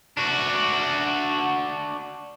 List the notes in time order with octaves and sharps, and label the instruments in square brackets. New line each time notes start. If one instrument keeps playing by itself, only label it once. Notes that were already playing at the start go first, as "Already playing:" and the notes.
[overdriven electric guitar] D4 F#4